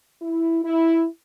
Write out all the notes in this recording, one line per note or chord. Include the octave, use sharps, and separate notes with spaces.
E4
E4